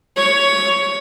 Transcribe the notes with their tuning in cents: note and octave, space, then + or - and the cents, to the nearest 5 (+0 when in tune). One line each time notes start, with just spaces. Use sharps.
C#5 +10